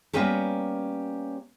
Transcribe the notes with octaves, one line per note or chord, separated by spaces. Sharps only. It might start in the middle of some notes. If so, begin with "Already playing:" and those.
G3 A#3 B3 C#4 G4 A4